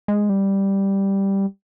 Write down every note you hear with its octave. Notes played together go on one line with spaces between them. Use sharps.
G#3
G3